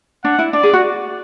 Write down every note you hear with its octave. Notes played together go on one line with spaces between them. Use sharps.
D4 F#5
E4
D4 D5
G#4
F#4